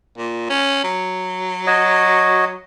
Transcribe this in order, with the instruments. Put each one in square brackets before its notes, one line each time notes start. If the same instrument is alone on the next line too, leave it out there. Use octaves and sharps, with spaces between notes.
[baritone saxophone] A#2
C#4
F#3
[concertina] F#4 C#5 D#5